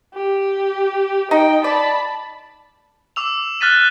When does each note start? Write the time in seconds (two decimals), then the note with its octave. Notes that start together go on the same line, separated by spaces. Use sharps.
0.13 G4
1.31 D#4 D#5 G5
1.64 D5 A5 B5
3.16 D6 E6 F7
3.61 F6 F#6 A6 B6 D#7